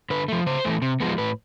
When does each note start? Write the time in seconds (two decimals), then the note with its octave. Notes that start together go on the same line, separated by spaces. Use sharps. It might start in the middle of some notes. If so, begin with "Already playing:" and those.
0.10 D3 B4
0.28 F3 A3
0.46 C#3 C5
0.65 E3 A3
0.82 C3
1.00 F3 G#3 B3
1.18 A2 B4